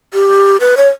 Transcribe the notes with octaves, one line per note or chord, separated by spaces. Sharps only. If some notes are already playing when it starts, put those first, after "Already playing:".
G4
B4
C#5